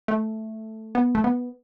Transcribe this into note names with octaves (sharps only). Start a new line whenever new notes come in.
A3
B3
A3
B3